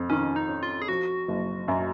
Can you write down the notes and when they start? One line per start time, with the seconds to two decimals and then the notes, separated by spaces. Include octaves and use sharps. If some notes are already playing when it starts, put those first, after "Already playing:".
Already playing: F2
0.10 D#3 C#4
0.36 D#4
0.49 C#4
0.63 F4
0.82 G#4
0.88 F3 F#4
1.28 F#1
1.68 F#2